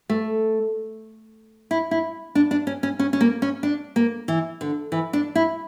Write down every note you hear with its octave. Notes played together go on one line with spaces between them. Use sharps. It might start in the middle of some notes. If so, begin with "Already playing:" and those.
A3
E4
E4
D4
D4
C#4
C#4
C#4
C#4
A#3
C#4
D4
A#3
E3
D3
E3
D4
E4